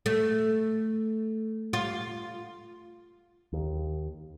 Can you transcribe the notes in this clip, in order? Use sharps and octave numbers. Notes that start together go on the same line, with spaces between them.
A3
F4
D#2